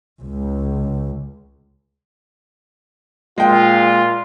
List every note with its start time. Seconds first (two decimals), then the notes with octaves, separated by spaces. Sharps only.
0.22 C#2
3.38 A#2 G#3 F4 G5